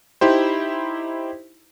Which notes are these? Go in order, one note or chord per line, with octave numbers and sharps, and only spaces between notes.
D#4 E4 G4 C5